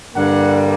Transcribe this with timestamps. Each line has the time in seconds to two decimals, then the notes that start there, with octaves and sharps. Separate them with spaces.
0.14 G2 D3 G3 A#3 F#5